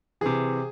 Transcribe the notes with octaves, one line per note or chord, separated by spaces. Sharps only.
C3 E3 G#4